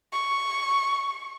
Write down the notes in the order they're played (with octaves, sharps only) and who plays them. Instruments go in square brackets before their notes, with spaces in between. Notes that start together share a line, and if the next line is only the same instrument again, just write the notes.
[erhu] C#6